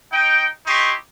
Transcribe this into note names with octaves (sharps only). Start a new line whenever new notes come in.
D#4 G5
D#4 E4 G4 C6 C#6